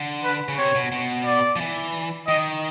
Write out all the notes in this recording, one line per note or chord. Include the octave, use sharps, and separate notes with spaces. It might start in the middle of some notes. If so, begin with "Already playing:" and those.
Already playing: D3
B4
C#3
C3 C#5
B2
B2
D5
F3
E3
D#3 D#5